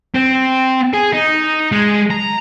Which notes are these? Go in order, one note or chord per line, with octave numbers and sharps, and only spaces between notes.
C4
G#4
D#4
G#3
A#5